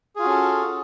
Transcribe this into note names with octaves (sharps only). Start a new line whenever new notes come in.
C#4 F4 F#4 G#4 A4